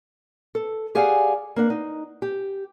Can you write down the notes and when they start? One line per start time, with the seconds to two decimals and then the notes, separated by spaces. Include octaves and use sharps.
0.55 A4
0.95 G4 G#4 D5 F5 F#5 G#5
1.56 A#3 D4 F#5
1.70 D#4
2.22 G4